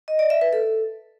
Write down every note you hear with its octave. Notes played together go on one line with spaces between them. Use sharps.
D#5
D5
E5
B4
A4